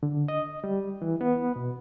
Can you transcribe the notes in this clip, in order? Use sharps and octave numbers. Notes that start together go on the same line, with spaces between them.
D3
D#5
G3
E3
B3
B2